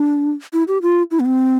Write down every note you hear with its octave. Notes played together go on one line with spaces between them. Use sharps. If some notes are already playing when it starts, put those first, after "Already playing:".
Already playing: D4
E4
G4
F4
E4
B3
C4